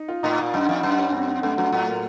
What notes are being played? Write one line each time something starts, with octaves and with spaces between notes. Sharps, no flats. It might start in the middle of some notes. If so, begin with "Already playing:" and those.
Already playing: D#4
F4
A2 D#4
A#2 D#4
F#2 D#4
F2 D#4
F#2 D#4
C#4
C4
C4
F#2 A3
F#2 F#3
A2 A3
A#3